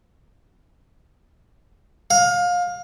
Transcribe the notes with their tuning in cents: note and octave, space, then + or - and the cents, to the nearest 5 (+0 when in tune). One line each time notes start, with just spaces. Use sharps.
F5 +25